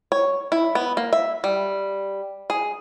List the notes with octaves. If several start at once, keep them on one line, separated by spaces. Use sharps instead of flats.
C#5
E4
B3
A#3
E5
G3
G#4